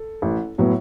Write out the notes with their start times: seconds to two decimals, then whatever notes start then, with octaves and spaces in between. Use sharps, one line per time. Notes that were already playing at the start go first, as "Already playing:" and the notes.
Already playing: A4
0.22 A1
0.58 A2 F#3 B3